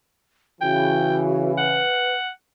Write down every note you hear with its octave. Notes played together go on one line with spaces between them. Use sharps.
C#3 E3 F#4 G5
B4 F#5